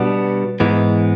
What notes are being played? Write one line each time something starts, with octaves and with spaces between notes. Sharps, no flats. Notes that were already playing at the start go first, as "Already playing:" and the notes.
Already playing: B2 G3 B3 D4 F#4
G#2 E3 G#3 B3